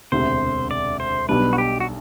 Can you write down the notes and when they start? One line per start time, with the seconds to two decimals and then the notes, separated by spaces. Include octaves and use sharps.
0.12 E1 D2 C3 C5
0.71 D5
1.00 C5
1.28 B1 B2 G3 D4 B4
1.53 F#4
1.58 G4
1.80 F#4